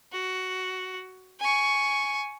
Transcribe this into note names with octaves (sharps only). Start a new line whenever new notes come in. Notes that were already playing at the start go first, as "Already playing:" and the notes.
F#4
G#5 C#6